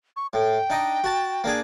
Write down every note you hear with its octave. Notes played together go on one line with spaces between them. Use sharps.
C#6
A2 G5
D4 D#4 D#5
F#4 A5
A#3 D4 G#4